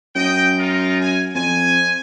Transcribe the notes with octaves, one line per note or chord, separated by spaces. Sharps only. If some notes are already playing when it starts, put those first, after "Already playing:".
F#2 D#5 G5
D#4 F4 A#4
G#5
F2 G#5